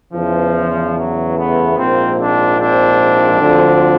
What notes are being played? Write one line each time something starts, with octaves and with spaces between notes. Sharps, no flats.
E2 C#3 E3 F3
F#3
A3 B3
A#1 G#2 F3 A#3 C4
C4 D4
C4 D4
D2 D3 F3